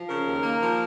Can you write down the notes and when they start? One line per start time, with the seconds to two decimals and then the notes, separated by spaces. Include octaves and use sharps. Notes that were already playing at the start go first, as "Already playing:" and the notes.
Already playing: F3
0.08 C#3 A#4
0.26 D#2
0.43 A#3
0.61 F3